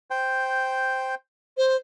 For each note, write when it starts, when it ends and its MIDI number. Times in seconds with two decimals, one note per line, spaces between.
0.10 1.15 72
0.10 1.15 79
1.57 1.76 72